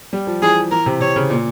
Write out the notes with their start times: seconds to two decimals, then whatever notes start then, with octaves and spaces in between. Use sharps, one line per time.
0.13 G3
0.27 F3
0.42 E3 G#4
0.71 E3 A#4
0.86 C3
1.00 C3 C#5
1.16 C#3
1.30 A#2